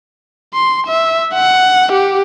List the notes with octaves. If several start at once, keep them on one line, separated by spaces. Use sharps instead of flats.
C6
E5
F#5
G4